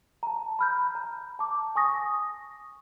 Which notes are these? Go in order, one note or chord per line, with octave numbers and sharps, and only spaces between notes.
A5 A#5
B5 F6 G6
A#5
A5 D6
G#5 C#6 D#6 A#6